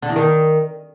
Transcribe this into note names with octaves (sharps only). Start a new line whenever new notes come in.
D3
E2
D#3